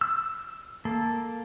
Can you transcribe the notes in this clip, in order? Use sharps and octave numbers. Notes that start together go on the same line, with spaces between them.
E6
A#3 A4